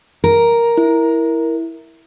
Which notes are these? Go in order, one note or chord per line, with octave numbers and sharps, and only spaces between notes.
A#4
E4